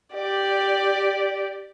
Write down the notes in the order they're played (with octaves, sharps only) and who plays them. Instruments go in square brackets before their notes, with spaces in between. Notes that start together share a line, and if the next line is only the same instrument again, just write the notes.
[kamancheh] G4 D5